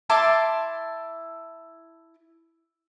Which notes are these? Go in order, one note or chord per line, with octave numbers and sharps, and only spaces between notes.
E4 A5 C6 D6